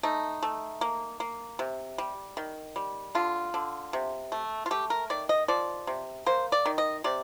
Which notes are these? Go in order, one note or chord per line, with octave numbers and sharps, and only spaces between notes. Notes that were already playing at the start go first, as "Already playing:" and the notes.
A3 D#4
A3
A#3
A#3
C3
G3
D#3
G3
D3 F4
D3
C3
A3
F4
A3 G4
A#4
D#3 D5
D#5
F3 D5
C3
A#3 C5
D5
D#3
D#5
C3 D5